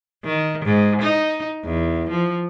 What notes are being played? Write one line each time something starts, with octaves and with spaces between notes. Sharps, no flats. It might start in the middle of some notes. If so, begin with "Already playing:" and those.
D#3
G#2
D#4
E2
F3